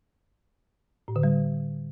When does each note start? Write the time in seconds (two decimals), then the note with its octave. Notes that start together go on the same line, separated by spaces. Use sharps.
1.08 A2
1.16 D3
1.23 G3